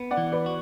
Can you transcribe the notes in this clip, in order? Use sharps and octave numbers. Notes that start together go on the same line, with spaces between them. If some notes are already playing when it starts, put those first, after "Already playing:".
Already playing: B3
D5 F#5
E3
B4 D5
F#4